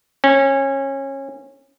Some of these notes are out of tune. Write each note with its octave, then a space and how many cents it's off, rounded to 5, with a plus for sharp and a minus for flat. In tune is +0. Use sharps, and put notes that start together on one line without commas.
C#4 -25